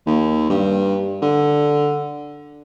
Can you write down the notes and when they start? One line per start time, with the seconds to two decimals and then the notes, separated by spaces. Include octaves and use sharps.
0.06 D#2
0.50 G2
1.22 D3